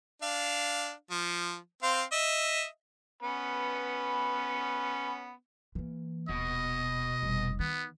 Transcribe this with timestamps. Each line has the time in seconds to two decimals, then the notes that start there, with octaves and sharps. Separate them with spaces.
0.22 D4 F5
1.11 F3
1.83 C4 C5 F5
2.12 D#5 E5
3.22 B3 C#4 B4
5.75 E3 A#3
6.29 D#1 B2 D#5
7.22 F1 G3
7.60 D#3 B3